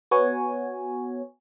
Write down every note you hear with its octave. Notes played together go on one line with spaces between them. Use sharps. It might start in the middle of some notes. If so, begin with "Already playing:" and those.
B3 F#4 C#5 G#5